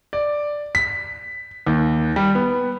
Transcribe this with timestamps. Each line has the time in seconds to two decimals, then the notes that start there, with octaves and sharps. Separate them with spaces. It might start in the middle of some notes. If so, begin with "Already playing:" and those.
0.13 D5
0.75 B6
1.67 D#2
2.16 G3
2.35 B3